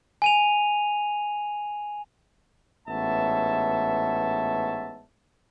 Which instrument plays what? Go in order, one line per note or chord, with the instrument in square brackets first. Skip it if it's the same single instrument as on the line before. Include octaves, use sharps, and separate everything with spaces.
[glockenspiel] G#5 D#7 F7
[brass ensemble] A1 G#2 B3 C#5 E5 A5